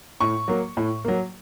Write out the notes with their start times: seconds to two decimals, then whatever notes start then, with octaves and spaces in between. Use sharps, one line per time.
0.21 A2 C#6
0.48 F#3 A#3
0.77 A2
1.05 F#3 A#3